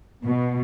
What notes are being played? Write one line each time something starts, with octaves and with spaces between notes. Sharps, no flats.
B2